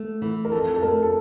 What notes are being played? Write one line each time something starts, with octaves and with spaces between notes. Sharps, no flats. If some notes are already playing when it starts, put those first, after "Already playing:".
Already playing: A3
E3
A#4
F2 A4
A4
A3 A#4
A4